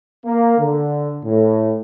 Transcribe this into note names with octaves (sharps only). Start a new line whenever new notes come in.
A#3
D3
A2